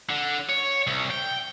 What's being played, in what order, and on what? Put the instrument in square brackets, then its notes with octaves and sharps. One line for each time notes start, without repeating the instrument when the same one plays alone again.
[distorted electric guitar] D3
C#5
C2
G5